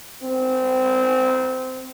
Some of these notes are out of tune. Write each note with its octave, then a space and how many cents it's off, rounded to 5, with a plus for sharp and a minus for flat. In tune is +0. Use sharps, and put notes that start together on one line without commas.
C4 -20